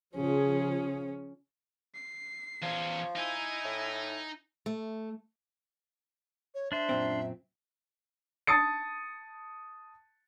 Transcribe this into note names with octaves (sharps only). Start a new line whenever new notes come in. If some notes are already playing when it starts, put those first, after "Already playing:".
C#3 F3 C#4 G#4
C7
E2 F3 C#4
D#4 E4 G#5
A2
A3
C#5
D4 C5 E5
F#2 A#2 C4
A5 D#6 A6 C#7